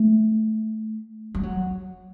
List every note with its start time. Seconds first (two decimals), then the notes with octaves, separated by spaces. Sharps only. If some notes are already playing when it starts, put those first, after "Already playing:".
Already playing: A3
1.35 G3
1.43 F#3